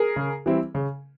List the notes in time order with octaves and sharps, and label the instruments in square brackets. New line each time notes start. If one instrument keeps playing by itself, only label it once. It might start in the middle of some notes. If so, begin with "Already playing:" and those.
Already playing: [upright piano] G#4 A#4
[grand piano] C#3
E3 G3 C4 E4
C#3